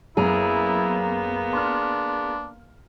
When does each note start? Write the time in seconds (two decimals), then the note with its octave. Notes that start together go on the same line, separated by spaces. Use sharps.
0.17 F#2 A#3 B3 E4 G#4 A#5 F7
1.53 D4 C6 F6